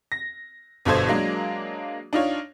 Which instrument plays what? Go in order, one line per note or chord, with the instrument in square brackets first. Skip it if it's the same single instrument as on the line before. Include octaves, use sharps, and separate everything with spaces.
[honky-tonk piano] A#6
G1 G2 B2 A4 C5 G#6
F#3 G#3 A#3 D4
D4 D#4 F4 C#5